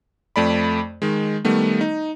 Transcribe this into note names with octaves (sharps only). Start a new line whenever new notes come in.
F2 A3 D5 B5
D#3 G#3
D#3 G3 A3 B3
D#4